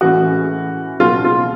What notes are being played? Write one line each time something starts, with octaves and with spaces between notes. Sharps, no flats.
A2 E3 G#3 C#4 F#4
C#2 B2 F#3 A#3 F4
F4